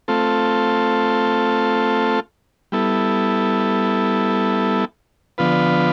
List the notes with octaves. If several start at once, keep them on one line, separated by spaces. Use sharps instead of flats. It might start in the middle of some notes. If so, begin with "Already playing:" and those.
A3 C4 F4 A4
G3 B3 E4 A4
D3 F3 B3 F4 B4